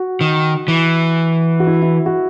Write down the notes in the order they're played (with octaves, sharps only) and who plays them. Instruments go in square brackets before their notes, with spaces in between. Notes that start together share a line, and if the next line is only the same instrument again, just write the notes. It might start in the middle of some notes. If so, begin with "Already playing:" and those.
Already playing: [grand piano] F#4
[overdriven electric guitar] D#3
E3
[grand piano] F#4
E4
E4
F#4